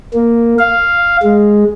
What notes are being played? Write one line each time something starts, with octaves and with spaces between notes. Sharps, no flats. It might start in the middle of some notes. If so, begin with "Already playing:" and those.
A#3
F5
G#3